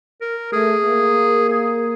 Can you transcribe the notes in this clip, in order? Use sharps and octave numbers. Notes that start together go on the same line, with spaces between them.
A#4
A3 G#4
A#3
G#4